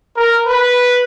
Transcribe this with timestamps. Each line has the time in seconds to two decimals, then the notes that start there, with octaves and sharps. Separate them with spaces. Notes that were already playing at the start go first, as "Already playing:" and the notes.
0.17 A#4
0.46 B4